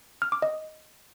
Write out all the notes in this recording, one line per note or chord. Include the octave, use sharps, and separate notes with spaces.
F6
D6
D#5